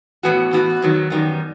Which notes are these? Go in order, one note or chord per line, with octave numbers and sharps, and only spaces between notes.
A2 E3 B3 F#4
A2 E3 B3 F#4
E2 D#3 F#3 B3
F#2 D#3 G3 B3